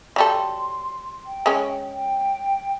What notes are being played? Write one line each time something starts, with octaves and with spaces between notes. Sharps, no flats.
F#3 G3 A4 C6
G5
G#3 C#4
G5